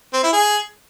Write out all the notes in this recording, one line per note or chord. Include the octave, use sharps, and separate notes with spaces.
C4
E4
G#4